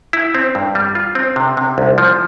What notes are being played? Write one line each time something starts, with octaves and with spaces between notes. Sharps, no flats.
E4
C4
G2
G3
F4
C4
C3
C3
C2
F3